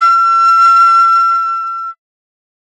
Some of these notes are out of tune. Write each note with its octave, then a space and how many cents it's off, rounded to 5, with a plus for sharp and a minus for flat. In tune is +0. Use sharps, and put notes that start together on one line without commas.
E6 +45